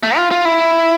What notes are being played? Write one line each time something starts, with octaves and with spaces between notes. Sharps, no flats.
A3
F4
F4
E4